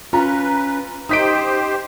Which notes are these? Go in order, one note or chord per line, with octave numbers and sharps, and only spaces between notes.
C#4 F4 B4 A#5
D#4 G4 C5 D#5 D#6 B6 D7